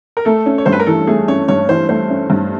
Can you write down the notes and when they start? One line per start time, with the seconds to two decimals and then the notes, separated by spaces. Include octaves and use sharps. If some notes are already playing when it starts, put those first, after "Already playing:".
0.17 A#4
0.25 A3 A4
0.46 C#4
0.58 C#5
0.66 G2 C5
0.72 B4
0.80 A#4
0.86 E3 A4
1.07 A3 G#4
1.28 C#4 C#5
1.48 G2 C#5
1.69 E3 C5
1.89 A3 C5
2.10 C#4
2.30 G2